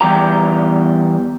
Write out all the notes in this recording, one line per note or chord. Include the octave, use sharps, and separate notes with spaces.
E2 G3 G4 A#5